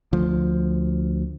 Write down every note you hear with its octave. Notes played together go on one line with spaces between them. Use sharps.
D2 F3